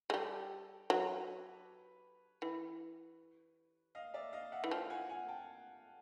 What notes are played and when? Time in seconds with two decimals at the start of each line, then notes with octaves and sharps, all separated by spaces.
0.10 G#3
0.14 G3 G4 A4
0.90 F#3 B4 C#5
2.42 E3
3.95 D#5 F5
4.14 D5 E5
4.33 D#5 F5
4.52 E5 F#5
4.64 E3
4.71 F3 F5 G5
4.90 F#5 G#5
5.09 F#5 G#5
5.28 G5 A5